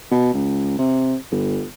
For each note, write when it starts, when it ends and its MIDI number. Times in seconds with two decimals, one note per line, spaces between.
0.11 0.32 47
0.34 0.74 37
0.78 1.15 48
1.32 1.65 31